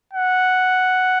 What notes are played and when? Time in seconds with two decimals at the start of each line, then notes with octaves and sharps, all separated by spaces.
0.13 F#5